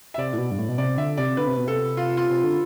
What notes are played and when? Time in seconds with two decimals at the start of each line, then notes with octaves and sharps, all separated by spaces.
0.14 E5
0.18 C3 D5
0.33 A2
0.38 B2
0.51 G2
0.58 A2
0.69 B2
0.78 C3 D5
0.98 D3 E5
1.17 C3 D5
1.37 D3 B4
1.47 C3
1.57 B2
1.66 C3 A4
1.97 F4
2.17 F4
2.30 C3
2.44 D3